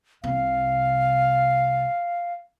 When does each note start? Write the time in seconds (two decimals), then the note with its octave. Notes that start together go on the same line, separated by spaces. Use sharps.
0.24 C2 C3 F5